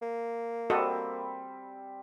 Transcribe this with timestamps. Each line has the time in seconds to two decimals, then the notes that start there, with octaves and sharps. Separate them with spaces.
0.02 A#3
0.70 G3 C4 F#4 A4 D#5